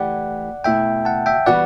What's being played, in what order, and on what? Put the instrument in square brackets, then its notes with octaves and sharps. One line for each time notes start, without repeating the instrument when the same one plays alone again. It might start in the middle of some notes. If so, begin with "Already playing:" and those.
Already playing: [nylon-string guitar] E3 A3 E4 G4 [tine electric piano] D5 F#5
[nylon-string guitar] B2 A3 E4 [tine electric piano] E5 G5
[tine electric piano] F#5 A5
E5 G5
[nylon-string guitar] E3 G3 B3 F#4 [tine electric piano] D5 F#5